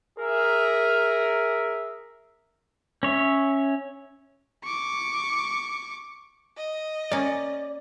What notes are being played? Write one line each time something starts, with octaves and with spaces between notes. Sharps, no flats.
G#4 A#4 E5
C#4 C#5 E5
C#6 D6
D#5
A#3 C#4 D5